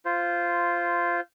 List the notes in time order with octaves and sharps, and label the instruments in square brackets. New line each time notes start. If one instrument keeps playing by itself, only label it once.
[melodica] F4 C5